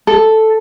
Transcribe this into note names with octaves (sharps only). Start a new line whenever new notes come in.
A4